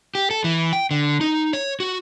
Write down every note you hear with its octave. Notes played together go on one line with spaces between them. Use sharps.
G4
A4
E3
G5
D3
D#4
C#5
F#4